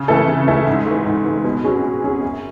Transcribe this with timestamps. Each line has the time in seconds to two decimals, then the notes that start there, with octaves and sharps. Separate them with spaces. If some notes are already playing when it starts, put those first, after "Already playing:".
Already playing: C#3
0.08 E3 A3 E4 A4
0.28 C#3
0.47 E3 A3 E4 A4
0.67 G#2
0.86 E3 A3
1.06 G#2
1.25 E3 A3
1.44 B2
1.64 F#3 C#4 G#4
1.83 B2
2.03 F#3 C#4 G#4
2.22 F#2